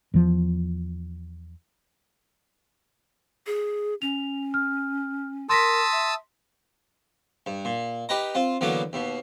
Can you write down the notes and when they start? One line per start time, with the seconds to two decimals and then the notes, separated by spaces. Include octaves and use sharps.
0.14 E2 F3
3.46 G#4
4.02 C#4 F7
4.54 F6
5.49 A#4 A5 C6 D#6 E6 A#6 B6
5.92 E5
7.46 G2
7.65 A#2
8.09 D#4 G4 B4 D#5 A#5
8.35 C4 F4
8.61 E2 D3 F#3 A#3 B3 D6
8.93 D#2 B2